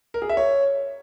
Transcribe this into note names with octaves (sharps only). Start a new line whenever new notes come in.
A#4
G#4
E5
C#5